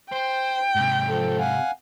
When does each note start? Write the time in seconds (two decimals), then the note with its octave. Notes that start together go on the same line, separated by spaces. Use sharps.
0.12 C5 G5
0.75 G#2 C3
1.09 F3 A4
1.39 F5 F#5 G#5